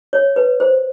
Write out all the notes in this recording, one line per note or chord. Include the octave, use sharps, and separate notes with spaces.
C#5
B4
C5